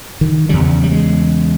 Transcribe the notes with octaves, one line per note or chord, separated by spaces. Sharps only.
D#3
E2 C#3 G3
G3
G#3